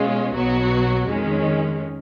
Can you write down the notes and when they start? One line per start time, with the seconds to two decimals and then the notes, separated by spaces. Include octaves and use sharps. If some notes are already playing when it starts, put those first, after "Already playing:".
Already playing: B2 G#3 C#4 F4
0.34 B1 B2 F#3 B3 F#4
1.08 F2 D#3 G#3 C#4